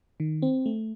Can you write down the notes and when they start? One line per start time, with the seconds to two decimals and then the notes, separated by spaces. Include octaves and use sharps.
0.20 D#3
0.42 C4
0.66 A3